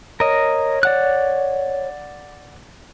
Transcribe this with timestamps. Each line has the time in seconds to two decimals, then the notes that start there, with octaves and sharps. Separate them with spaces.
0.20 A#4 C#5 D#5
0.83 D5 F#5 F#6